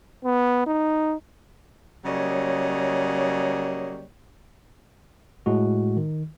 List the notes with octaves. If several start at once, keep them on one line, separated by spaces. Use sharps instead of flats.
B3
D#4
C#3 F#3 G3 A#3 C#5 D#5
A2 G#3 F#4
D#3